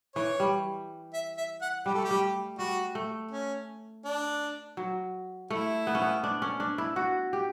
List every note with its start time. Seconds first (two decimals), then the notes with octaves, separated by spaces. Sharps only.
0.15 E3 C#5
0.40 G3
1.13 E5
1.37 E5
1.61 F#5
1.86 G3 G4
1.94 A3 A4
2.04 G4
2.11 G3
2.58 G3 F#4
2.95 A3
3.31 C#4
4.05 D4
4.77 F#3
5.50 A3 E4
5.87 B3
5.95 C#4
6.02 B3
6.24 D4
6.42 C#4
6.60 D4
6.78 E4
6.96 F#4
7.33 G4